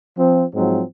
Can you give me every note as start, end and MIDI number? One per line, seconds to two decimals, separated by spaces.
0.17 0.44 53
0.17 0.44 60
0.55 0.82 44
0.55 0.82 53
0.55 0.82 54
0.55 0.82 60